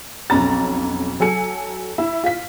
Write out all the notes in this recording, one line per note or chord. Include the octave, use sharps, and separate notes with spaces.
B1 F2 C#4 A#5 A6
F#3 A4 G#5 C#7
E4
F4 F5 B6